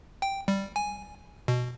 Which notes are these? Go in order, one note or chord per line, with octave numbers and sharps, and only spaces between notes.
G5
G3
G#5
B2